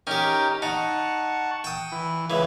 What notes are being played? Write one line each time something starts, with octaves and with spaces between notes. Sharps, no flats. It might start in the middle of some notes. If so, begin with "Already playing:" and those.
C#4 D#4 G4 A#4 G5
D#4 F#5 A5 C#6
G5 D#6
E3
C#2 E3